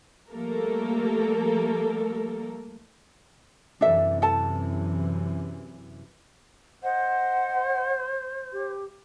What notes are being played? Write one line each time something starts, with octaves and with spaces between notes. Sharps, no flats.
F3 G3 A3 A#3 A4 A#4
F#2 C3 E3 D4 A4 E5
A4 A5
C5 D#5 F#5
G4